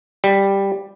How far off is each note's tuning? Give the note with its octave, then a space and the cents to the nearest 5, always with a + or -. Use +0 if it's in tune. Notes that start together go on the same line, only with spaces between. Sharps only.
G3 +5